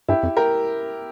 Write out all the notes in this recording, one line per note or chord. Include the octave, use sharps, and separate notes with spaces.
G2 E4 G4
F2
G4 A#4